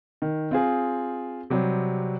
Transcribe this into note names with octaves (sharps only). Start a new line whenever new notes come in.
D#3
C4 F4 G#4
C3 F#3 G3 C4